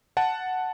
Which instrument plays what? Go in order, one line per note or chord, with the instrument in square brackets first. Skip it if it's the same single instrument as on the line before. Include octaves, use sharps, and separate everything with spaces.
[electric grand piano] F#5 A5